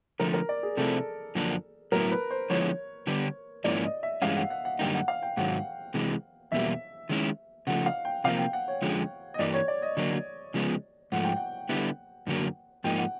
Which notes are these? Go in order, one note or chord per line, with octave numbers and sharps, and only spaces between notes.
D3 F3 A3 A#4
A#4
D5
G#4
C3 F3 A3 C4 E4 A4
F#2 D3 F3 A#3 D4
A2 F#3 B3 E4 A#4
B4
C5
D3 F3 G#3 B3 E4 C#5
D3 G3 B3 D4
G#2 F3 A#3 C#4 E4 D5
D#5
E5
G2 E3 G#3 C#4 F5
F#5
F#5
F#5
F#2 D3 G3 A#3 D#4 G5
F#5
F5
G5
G#2 D#3 F#3 F#5
C3 E3 G#3
E2 B2 G3 A#3 E5
D#3 G#3 C#4 E4
C#3 F3 A3 F#5
F5
G5
C3 F3 A#3 F5
G5
F#5
C#5
F2 D3 F3 G#3 C#4
D#5
G2 E3 G3 A#3 D5
C#5
D5
D#5
D3 F#3 A#3
C#3 F3 G#3 B3
G#2 F3 A3 F#5
G5
F#5
D3 G3 B3 E4
F#2 D3 F#3 A#3
G#2 F3 A#3 D#4 G5
F#5